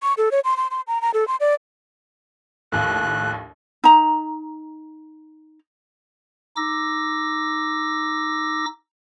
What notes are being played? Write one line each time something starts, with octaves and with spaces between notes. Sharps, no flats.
C#6
A4
C#5
C6
C6
C6
A#5
A#5
A4
C6
D5
A#1 D#2 A2 F#6
D#4 A#5
D#4 D6 E6 A#6